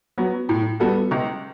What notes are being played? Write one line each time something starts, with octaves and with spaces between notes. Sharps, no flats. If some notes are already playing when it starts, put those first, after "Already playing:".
F#3 B3
A2
G3 B3 F#4 A4
C#2